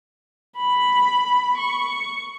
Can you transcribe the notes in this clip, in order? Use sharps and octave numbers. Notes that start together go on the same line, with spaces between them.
B5
C#6